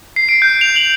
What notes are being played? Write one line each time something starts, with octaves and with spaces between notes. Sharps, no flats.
C7
D7
G6
F7
F#7